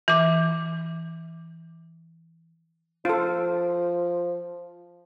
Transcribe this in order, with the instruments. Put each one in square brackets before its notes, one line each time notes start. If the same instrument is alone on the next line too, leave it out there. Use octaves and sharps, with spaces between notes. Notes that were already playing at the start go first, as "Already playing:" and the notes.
[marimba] E3 D6
[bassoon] F3 [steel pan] F4 A4